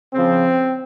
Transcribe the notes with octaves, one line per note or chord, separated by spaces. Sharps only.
C#3 F3 C4